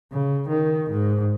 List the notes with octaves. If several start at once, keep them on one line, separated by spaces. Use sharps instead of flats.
C#3
D#3
G#2